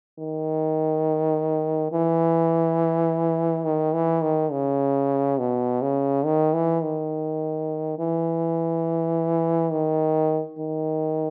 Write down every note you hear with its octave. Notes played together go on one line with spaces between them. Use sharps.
D#3
E3
D#3
E3
D#3
C#3
B2
C#3
D#3
E3
D#3
E3
D#3
D#3